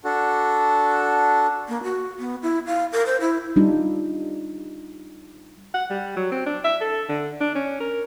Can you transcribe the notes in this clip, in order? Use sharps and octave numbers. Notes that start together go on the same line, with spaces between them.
D4 F#4 A4
A#3
F#4
B3
E4
F5
A#4
C5
E4
G3 D4 D#4 F4
F#5
G3
F#3
C4
D4
E5
A4
D3
D4
C#4
A#4